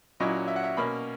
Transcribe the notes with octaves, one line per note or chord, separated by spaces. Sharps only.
A#2 F#3 C#4 E4 D#5
E5
F#5
E5
B2 A#3 C#4 B5